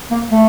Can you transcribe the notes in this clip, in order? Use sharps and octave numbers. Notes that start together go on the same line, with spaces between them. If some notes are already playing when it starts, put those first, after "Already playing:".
A#3
A3